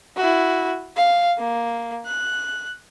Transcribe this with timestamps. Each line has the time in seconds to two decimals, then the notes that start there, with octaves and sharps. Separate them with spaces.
0.16 E4 F#4
0.96 F5
1.39 A#3
2.06 F#6